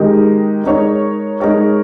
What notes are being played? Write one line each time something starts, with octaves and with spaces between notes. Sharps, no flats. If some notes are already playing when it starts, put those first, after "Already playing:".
Already playing: D#3 G#3 D#4 G4 A#4
G#3 D#4 A#4 C#5
G#3 D#4 A#4 C#5